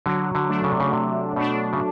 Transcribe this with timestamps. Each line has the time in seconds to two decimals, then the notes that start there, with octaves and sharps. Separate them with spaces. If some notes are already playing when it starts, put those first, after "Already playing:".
0.06 D3 F#3
0.35 D3
0.49 A3 D4
0.64 C#3
0.72 C3
0.80 C#3
0.93 C3 F#3
1.36 B2 A3 D4
1.73 C#3